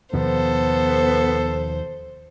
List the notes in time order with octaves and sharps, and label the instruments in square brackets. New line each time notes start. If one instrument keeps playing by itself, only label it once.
[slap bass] D#2 B2 F3 [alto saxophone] B3 [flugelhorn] A4 [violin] C5